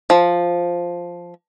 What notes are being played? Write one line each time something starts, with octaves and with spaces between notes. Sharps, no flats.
F3